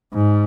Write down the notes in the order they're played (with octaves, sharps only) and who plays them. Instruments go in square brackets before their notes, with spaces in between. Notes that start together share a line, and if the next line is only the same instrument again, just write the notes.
[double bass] G#2